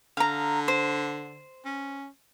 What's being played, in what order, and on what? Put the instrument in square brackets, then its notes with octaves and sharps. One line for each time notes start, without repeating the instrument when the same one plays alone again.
[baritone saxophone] D3 [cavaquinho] F5 A#5
[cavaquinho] C5
[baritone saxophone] C#4